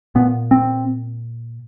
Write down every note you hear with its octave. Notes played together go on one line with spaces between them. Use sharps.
A#2 B3
C4